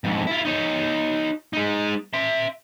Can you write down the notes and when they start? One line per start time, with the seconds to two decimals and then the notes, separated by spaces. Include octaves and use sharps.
0.04 F2 G#2
0.27 E4 F4
0.45 D#4 C#5
1.53 G#3 D#4
2.14 E5 C6